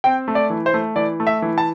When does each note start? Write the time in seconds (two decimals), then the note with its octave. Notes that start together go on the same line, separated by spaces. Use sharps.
0.04 C4 G5
0.28 A3
0.35 D5
0.50 E3
0.66 C5
0.74 A3
0.96 E3 D5
1.20 A3
1.27 E5
1.42 E3
1.58 A5